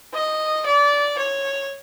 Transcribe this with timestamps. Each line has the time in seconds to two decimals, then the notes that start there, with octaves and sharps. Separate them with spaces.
0.14 D#5
0.66 D5
1.19 C#5